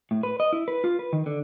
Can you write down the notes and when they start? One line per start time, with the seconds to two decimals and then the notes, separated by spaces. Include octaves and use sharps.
0.11 A2
0.23 B4
0.40 D#5
0.53 E4
0.68 B4
0.84 F4
0.99 B4
1.13 D#3
1.26 D3